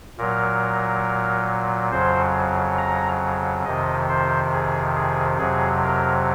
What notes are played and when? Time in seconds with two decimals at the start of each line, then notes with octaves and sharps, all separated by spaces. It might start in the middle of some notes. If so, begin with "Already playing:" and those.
0.18 A#2 F#3 A#4
1.92 F2 C#3 F#3 C5
2.78 A#5
3.65 F2 C3 D#3 D#5
4.09 C5
4.52 G#4
4.96 G#4
5.39 F2 C3 F#3 G#4
5.83 A#4